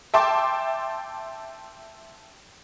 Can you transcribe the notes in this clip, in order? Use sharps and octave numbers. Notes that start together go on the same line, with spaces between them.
E5 G5 A5 C6 D6